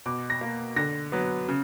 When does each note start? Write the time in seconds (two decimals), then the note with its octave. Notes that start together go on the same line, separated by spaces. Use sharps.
0.06 B2 D6
0.30 A#6
0.41 A#3
0.76 D3 A#6
1.12 F#3 B3
1.48 C#3